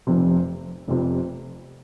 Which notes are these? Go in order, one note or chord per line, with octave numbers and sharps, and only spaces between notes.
F1 F2 C3
F1 F2 C3